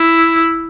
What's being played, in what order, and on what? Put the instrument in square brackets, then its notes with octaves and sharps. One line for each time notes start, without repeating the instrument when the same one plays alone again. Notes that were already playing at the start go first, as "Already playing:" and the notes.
Already playing: [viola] E4